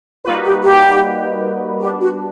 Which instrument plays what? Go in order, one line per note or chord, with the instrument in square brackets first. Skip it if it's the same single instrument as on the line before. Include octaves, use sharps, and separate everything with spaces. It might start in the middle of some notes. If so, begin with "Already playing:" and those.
[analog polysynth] G3 A#3 D#4 F#4 B4 [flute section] F4
[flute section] G4
G4
[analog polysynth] G3 B3 D4 [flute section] G4
[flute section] F#4